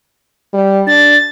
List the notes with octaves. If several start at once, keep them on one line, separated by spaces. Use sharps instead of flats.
G3
D4 A6